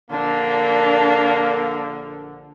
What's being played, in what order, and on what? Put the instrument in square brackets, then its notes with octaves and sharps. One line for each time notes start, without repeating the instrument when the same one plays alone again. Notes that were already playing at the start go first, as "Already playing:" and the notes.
[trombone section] A#1 D3 [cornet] A#3 [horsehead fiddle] D4